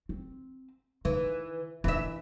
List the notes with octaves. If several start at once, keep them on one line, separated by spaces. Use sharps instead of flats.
C4
D#3 E3
D#3 E3 D4 E5